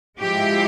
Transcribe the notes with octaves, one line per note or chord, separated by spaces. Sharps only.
F3 G#3 E4 G4